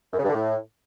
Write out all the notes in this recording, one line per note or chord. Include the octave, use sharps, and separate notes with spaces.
F#2
C#3
G2
D3
A2